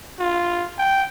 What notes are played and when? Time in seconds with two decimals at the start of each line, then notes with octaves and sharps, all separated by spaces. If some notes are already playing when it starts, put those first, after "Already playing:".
0.19 F4
0.79 G5